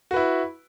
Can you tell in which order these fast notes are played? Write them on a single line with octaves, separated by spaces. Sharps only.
F#4 B4 E4